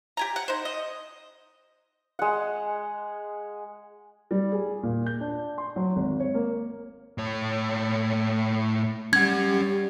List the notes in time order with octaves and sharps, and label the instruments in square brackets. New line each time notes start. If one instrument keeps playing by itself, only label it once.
[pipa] G4 G#5 A#5
F#5
D#4 C5
D#5
[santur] G#3 F#5
[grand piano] G3
G#4
A#2
G6
D4
C6
F#3
G#1
C#5
A#3
[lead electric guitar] A2 C#5
[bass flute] G3 [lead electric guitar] C#4 F#5 [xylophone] G#6